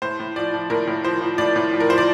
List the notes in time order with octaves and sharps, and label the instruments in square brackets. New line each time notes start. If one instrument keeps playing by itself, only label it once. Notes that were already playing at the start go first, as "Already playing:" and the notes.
[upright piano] A2 C5
A2
F3 D5
F3
A2 A#4
A2
F3 C5
F3
A2 D5
A2
F3
A#4
F3 C5
D5